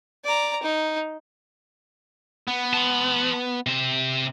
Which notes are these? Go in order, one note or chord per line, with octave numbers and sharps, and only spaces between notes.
D5 A#5
D#4
B3
A5 C6
C3 C5